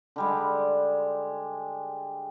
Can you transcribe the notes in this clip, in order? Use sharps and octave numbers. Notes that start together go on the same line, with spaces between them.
D3 G3 G#3